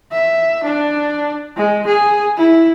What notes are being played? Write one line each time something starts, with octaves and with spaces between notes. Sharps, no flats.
E5
D4
G#3
G#4
E4